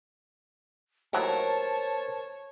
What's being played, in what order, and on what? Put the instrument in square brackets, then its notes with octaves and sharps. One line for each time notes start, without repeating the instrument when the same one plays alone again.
[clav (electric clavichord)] D#2 A2 F#3 [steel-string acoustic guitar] A#4 C5 [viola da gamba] C#5 [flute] A5